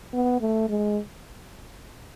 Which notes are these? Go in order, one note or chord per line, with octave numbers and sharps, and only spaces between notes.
B3
A3
G#3